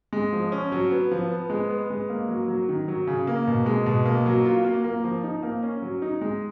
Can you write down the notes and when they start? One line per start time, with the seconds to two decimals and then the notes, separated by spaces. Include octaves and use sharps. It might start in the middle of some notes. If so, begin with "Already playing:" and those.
0.13 G#3
0.33 F3
0.52 C#4
0.72 F#3
0.91 B3
1.11 F3
1.31 B3
1.50 G#3
1.70 B3
1.90 G#3
2.10 A#3
2.28 F#3
2.48 F#3
2.69 D#3
2.88 F#3
3.07 C#3
3.27 A#3
3.47 B2
3.66 G#3
3.86 B2
4.06 A#3
4.26 F#3
4.45 F4
4.65 A#3
4.84 A#3
5.04 F3
5.24 D#4
5.43 A#3
5.63 C#4
5.82 F#3
6.02 D#4
6.21 G#3